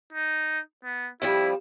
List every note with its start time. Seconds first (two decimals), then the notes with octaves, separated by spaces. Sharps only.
0.13 D#4
0.84 B3
1.22 F2 F3 G3 E4